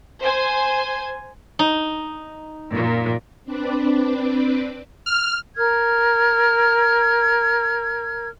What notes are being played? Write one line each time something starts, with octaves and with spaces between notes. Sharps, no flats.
C5 G#5
D#4
F#2 A#2
C4 D4 B4 D5
F6
A#4 F6 G#6